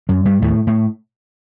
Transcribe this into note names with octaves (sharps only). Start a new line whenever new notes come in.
F#2 F#3
G2 G3
D#2 A2 A3
A2 A3